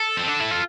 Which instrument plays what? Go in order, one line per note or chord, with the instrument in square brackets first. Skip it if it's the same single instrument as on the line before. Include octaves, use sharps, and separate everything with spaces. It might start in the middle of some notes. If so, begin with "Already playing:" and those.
Already playing: [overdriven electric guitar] A4
C4
D4
E4
F4